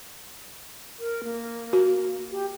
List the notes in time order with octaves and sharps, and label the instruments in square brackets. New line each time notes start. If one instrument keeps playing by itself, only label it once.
[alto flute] A#4
A#3
[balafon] F#4
[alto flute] G4